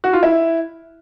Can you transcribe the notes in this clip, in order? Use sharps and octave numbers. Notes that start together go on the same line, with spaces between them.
F#4
F4
E4